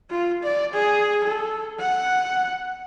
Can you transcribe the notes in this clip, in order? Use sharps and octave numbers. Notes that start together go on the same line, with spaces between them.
F4
D5
G#4
A4
F#5